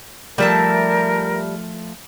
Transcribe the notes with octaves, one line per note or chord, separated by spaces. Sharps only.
F3 G3 A3 A#4 E5 A5